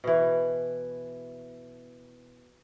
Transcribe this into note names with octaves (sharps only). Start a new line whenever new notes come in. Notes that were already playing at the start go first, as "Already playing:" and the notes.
B2 E3